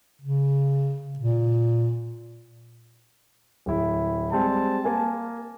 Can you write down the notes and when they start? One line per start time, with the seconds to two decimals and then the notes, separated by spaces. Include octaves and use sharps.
0.22 C#3
1.19 A#2
3.66 D1 E4
4.32 G3 G#3 C4 A5
4.84 A#3 A#4 G#5